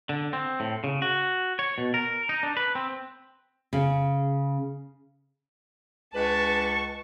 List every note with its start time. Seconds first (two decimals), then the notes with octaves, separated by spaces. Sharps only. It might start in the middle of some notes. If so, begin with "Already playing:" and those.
0.09 D3
0.33 C4
0.60 A2
0.84 C#3
1.02 F#4
1.59 C#5
1.78 B2
1.94 A#4
2.29 D#4
2.43 D4
2.57 B4
2.75 C4
3.73 C#3
6.14 C#2 G#3 D4 B4 A5 C#6